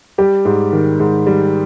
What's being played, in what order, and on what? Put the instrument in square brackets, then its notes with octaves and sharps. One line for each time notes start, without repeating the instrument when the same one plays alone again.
[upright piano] G3 G4
G#2
D#3
G#2
G3